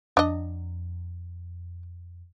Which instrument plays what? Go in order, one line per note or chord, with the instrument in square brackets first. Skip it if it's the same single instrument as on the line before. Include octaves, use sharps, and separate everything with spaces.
[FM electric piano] F2 [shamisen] D4 D#5